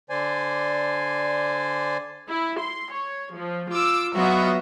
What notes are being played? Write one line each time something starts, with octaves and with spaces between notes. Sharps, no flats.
D3 C5 D5 G#5
E4
C6
C#5
F3
F4 D6 E6
F#3 B3 F4 F#4 D#5 E5